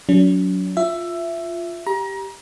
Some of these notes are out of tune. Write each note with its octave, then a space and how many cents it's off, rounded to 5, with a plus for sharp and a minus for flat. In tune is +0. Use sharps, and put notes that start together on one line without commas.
F#3 +0 C#4 +45
F4 +0 E5 +15
G4 +0 A#5 +30